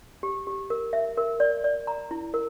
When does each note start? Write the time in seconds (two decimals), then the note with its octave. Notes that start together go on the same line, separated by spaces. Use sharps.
0.23 G4
0.47 G4
0.70 A#4
0.93 E5
1.18 A#4
1.40 D5
1.64 D5
1.87 A#5
2.11 E4
2.34 A#4